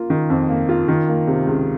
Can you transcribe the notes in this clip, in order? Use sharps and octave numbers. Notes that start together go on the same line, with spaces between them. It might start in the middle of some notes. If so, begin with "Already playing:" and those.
Already playing: A#3 F4
D#3
F2
A#3
F4
D#3
A#3
C3
C#2